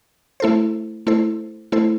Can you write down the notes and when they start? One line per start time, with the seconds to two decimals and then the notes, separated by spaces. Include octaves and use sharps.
0.40 A3 E4 A4 C5
1.07 A3 E4 A4 C5
1.72 A3 E4 A4 C5